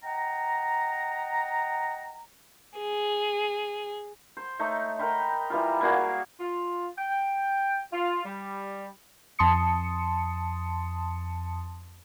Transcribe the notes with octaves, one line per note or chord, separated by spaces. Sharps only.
D#5 F#5 G5 A#5
G#4
C5
A3 D#4 C#5
A#4 G5 B5 C6
E3 G3 F4
G3 A#3 F#4 G#4
F4
G5
F4
G3
F2 A5 C6 D#6 C#7